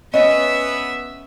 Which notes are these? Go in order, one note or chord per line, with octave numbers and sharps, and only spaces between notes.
B3 C#4 D#5 E5